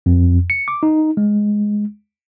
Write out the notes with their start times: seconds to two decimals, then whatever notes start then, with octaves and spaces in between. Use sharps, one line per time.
0.06 F2
0.50 C#7
0.68 D6
0.83 D#4
1.17 G#3